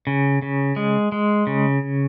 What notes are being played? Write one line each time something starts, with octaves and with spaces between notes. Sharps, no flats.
C#3
C#3
G#3
G#3
C#3